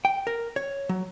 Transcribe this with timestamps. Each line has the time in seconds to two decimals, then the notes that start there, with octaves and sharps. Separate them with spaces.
0.05 G5
0.27 A#4
0.56 C#5
0.89 F#3